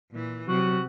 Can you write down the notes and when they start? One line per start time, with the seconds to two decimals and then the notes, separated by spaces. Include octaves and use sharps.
0.11 A#2 E3
0.48 C3 F#3 F#4